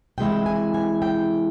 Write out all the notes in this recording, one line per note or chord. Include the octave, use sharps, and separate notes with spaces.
C3 E3 G#3 E4 G5
G#5
G#5
G5